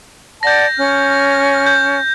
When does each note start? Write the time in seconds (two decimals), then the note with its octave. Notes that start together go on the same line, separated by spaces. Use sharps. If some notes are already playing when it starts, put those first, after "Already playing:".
0.43 D5 F#5 A5 G6 A#6
0.76 C#4 F6
1.67 G6